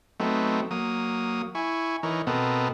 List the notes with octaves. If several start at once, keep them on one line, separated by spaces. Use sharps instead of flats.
F#3 A3 B3 C4 D#4
F#3 A#3 D#6
E4 G#5 C#6
E3 D#4 A#4 C#5
B2 B3 C4 A4 A#4 D#5